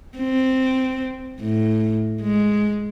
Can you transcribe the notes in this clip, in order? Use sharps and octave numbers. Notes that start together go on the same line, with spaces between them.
C4
A2
G#3